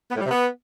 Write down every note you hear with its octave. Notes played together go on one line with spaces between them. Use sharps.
B3
A2
G3
C3
B3